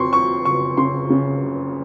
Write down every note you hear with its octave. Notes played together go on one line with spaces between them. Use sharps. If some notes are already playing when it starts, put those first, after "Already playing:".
Already playing: F2 C6 C#6
F2 C#6
F#1 C#6
C#3 C6
C#3
F#1